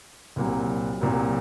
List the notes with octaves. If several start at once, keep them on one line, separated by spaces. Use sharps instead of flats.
C2 A#2 F#3
C2 A#2 F#3